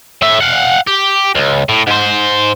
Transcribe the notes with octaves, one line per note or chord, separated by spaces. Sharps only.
A2 E5
F5 F#5
G4
C#2
A2
G#2 C5